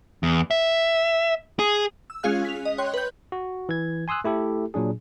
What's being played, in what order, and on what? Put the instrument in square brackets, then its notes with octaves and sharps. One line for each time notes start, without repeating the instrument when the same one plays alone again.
[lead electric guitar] E2
E5
G#4
[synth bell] E6
G#3 C#4 F4 G#4 F5 F#6
B6 F7
D#5
C#5 G5 C6 F#6
B4 G6
[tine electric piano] F#4
E3 G#6
G#5 C6 D#6 E6 F#6
A3 E4 G4 A4
A#2 F#3 D4 G#4